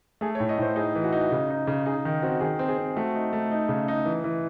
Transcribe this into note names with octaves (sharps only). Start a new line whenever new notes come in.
A3 G#4
C#5
A2
D#5
A2 C5
D#4 G#4
E3
F#4
D#4
C#3
D#4
C#3
D#4 G#4
D#3
C4 F#4
D#3 G#4
C4
G#4
C4
A3 F#4
D#4
A3
D#4
C#3
D#4
E3
E3